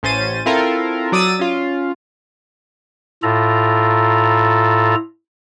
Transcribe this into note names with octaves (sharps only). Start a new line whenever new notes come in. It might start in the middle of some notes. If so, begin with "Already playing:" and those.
A1 C#4 C5 A6 D#7
C4 E4 F4 A4 A#4
F#3 D5 D#6 E6 A6 D#7
C#4 F4
A2 F4 A4 A#5